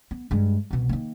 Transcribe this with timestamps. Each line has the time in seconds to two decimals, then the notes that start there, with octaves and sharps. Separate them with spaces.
0.11 B3
0.31 G2 G#3
0.71 C2 B2
0.89 D#3 A#3